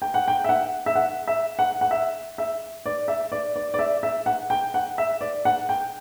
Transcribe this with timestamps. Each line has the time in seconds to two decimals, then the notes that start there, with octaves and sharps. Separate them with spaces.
0.02 G5
0.14 F#5
0.28 G5
0.44 E5
0.49 F#5
0.86 E5
0.95 F#5
1.27 E5
1.59 F#5
1.81 F#5
1.91 E5
2.38 E5
2.86 D5
3.08 E5
3.32 D5
3.56 D5
3.74 D5
3.79 E5
4.03 E5
4.26 F#5
4.50 G5
4.74 F#5
4.98 E5
5.21 D5
5.45 F#5
5.69 G5